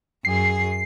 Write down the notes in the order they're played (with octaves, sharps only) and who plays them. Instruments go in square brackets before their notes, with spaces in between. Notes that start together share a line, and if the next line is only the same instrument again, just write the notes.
[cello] F#2 G#4 [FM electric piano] C7